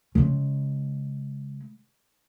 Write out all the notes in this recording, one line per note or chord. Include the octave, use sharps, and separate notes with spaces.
C#3 G#3